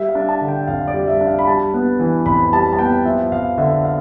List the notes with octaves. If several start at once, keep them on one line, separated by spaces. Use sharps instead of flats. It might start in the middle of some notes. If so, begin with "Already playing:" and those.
Already playing: G3 E5
F5
D4
A5
D3
G5
F2 F5
D5
G3
E5
D4
F5
B5
G3 A5
B3
E3
F2 B5
G3 A5
A5
B3 G5
F3 E5
F2 F5
D3 E5
F5